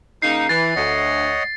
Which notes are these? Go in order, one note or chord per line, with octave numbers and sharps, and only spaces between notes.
C#3 A#3 D#4 C7
E3 A6
D2 C#5 D#5 F#5